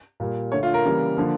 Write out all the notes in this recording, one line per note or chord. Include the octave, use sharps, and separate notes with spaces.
A#2 G3 A#3
D3 A3 C#5
F4
A#4
C#3 E3 G3 A#3
D3 F3 A#3